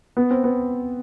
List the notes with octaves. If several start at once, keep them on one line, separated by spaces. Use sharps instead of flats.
B3
C4
B3